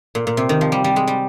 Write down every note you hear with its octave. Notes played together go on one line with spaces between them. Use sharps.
A#2
A#2
C3
D#3
F3
G3
G3
G#3
G3